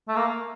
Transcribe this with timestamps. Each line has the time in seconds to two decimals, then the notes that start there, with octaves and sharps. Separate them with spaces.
0.08 A3
0.16 A#3